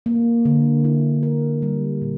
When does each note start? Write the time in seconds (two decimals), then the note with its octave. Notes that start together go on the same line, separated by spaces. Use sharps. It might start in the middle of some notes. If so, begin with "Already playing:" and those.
0.06 A#3
0.45 D3
0.84 E4
1.23 A#4
1.62 G3
2.02 A#2